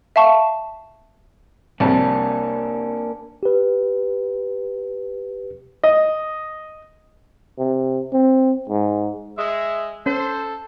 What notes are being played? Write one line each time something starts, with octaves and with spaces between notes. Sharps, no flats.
E5 F5 A5 C#6
C2 F2 C3 A#3 C#4 D4
G4 B4
D#5
C3
C4
G#2
G#3 E5
C#4 A4 C5